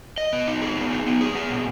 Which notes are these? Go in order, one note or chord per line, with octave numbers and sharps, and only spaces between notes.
D#5
B3
D#4
G#4
B3
D#4
B3
G#4
B3
A#2